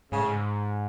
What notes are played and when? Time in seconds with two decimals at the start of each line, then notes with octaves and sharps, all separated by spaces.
0.12 G#2 C#3
0.19 A2
0.27 G#2